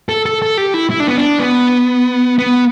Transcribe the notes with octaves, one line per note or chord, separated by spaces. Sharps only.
A4
A4
A4
G4
E4
E4
D4
B3
D4
B3
B3